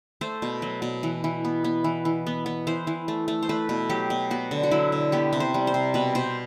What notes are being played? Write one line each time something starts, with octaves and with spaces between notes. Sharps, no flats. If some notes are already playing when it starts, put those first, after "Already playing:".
A3 C5
B2
F#3
B2
E3
E3
B3
B3
E3
E3
B3
B3
E3 C5
E3
A3
A3
C5
A3 B4
B2
F#3 G4
B2
B3 F#4
D3
F#4
F#3 E4
D3
B3 G4
C3
C5
G3
C5
C3
B2 B4
B2 C5